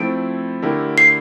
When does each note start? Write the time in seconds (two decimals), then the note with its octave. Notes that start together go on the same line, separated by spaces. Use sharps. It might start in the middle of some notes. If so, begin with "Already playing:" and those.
Already playing: F3 A3 C4 E4 D7
0.62 D3 A3 E4 G4 A#4
0.98 C7